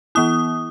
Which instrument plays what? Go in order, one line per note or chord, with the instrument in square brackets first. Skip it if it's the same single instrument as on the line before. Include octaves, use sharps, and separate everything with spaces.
[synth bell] E3 B3 E4 D#6